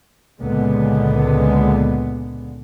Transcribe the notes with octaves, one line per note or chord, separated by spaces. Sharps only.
C#2 A#2 D3 G#3 B3